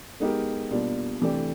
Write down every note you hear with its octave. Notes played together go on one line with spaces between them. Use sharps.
G#3 B3 D#4 G4 A#4
B2 G3 A#3 D4 F4
C3 E3 A3 D4 G4